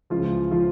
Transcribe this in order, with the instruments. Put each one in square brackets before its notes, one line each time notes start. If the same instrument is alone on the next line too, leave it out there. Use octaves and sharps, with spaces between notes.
[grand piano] C#2 C#3 E3 F3 F4
F3 F4